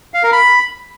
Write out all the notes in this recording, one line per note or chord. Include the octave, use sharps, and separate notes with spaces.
F5
A#4
B5